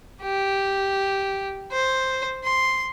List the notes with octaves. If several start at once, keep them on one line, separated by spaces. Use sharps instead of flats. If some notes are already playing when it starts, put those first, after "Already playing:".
G4
C5
C6